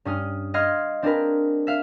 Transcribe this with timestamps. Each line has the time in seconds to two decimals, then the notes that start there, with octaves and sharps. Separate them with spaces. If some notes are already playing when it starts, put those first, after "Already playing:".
0.05 G2 C#4 D#6 F6
0.54 D#5 F5 C6 F6 G#6 C7
1.02 C4 D4 G#4 A#4 B4
1.67 E5 F5